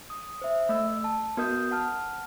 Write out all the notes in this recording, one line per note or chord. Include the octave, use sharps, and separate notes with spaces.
D#6
C5 E5
A3 D#5 E6
A5
B3 F#4 A#4 D#5 D#6 G6
F#5 A5 F6